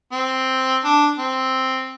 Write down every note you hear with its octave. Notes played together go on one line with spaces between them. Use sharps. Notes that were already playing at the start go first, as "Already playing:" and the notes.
C4
D4
C4